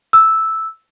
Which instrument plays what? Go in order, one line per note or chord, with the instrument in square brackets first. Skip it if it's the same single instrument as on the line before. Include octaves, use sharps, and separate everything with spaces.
[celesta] E6